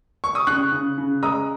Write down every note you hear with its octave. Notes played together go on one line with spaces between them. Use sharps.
C#6
D#6
C#3 C#6 F#6
C#3
C#3
G#3 A#5 D#6